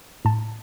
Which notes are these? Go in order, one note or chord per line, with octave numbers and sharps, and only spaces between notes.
A2 A5